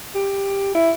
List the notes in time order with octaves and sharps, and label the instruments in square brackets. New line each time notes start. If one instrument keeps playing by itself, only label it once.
[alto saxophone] G4
E4